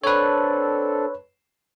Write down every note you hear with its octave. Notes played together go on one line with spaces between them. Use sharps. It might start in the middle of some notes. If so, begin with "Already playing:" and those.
C4 D4 A4 B4 C#5